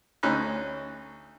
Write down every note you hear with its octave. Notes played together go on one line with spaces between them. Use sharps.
D2 C#4 D#4 B5 F#6